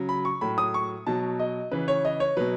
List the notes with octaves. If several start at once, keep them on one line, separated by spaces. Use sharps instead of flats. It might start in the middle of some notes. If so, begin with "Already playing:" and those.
Already playing: C#3 F#3
B5
C#6
A2 F#3 B5
D#6
C#6
B2 F#3 A5
D#5
C#3 E3 B4
C#5
D#5
C#5
B2 F#3 B4